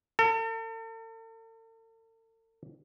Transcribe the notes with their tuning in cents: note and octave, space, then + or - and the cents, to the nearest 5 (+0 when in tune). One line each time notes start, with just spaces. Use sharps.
A4 +40